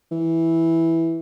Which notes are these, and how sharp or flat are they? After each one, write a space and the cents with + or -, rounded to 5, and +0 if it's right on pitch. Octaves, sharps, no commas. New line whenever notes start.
E3 -5